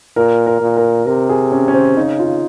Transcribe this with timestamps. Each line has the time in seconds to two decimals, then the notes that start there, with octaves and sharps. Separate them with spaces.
0.16 A#2 A#4
0.47 A#4
0.61 A#2
0.77 A#4
1.06 C3 A#4
1.29 G#4
1.52 C#4
1.68 C#4
1.74 C4
1.97 C#3 D#4
2.19 F4